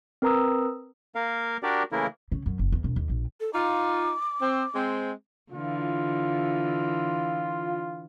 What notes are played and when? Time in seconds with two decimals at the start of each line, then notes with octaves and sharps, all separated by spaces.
0.22 C4 A#4 B4 A#5 D#6 E6
1.15 A#3 A#4 F5
1.63 D4 F#4 G4 A#4 D5
1.92 C#3 E3 A3 A#3 E4 A#4
2.32 C#3
2.46 F#2
2.59 F#1
2.72 E2
2.84 E1
2.96 D#2
3.09 A#1
3.40 A4
3.53 D#4 F4 D6
4.40 C4
4.75 G#3 C4
5.52 D3 E3 F4